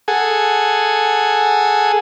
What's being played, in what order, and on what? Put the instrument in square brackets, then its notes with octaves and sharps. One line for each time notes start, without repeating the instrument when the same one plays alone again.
[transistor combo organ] G#4 A4 F#5 G#5